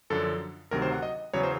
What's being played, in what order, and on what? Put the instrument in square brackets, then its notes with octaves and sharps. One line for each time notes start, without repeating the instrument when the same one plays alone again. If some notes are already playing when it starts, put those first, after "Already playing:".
[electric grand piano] F#2 D3 F3 A4
D2 C3 D#3 F#3 A#4
C5
F#5
D#5
E2 C#3 F#3 C#5
C5